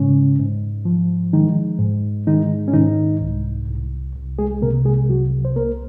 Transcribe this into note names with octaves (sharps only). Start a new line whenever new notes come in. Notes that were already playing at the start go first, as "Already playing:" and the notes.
Already playing: G#2 C#3 G#3 C#4
G#2
F3
D#3 G#3 D#4
G#2
D#3 G#3 D#4
C#4
G#2 D#3 D#4
C2
C2
C2
G#3 G#4
C3 A#3 A#4
G#3 G#4
C2 F#3 F#4
C5
C2 A#3 A#4